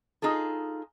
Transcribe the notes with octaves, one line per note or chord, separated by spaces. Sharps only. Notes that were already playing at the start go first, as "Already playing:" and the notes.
D#4 F4 G#4 A4